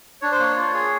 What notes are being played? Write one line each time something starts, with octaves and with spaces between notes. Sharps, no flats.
D4 C#5
C5
A#3 C#5
F4
G#4